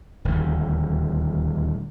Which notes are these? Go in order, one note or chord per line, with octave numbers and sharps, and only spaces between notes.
D#1 D2